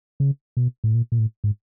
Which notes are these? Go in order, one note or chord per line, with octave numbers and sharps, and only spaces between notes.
C#3
B2
A2
A#2
A#2
A2
G#2